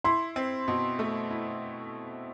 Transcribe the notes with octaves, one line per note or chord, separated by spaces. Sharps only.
E4 C6
C4
B2
A3
E4